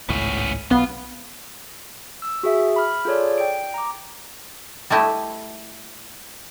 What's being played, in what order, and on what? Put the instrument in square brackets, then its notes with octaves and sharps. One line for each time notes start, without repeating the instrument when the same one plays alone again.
[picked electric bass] G#1 C#2 A2 [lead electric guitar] B3 C#4
[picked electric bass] B1 [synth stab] B3 [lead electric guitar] F4
[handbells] E6
F#4 G#4 E5
B5 F6
F4 G#4 A4 C#5 D5
G5 D7
A#5 D6
[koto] G3 A3 E4 D#5